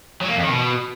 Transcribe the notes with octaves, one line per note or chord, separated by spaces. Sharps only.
F#3
A#3
F2
D#3
B2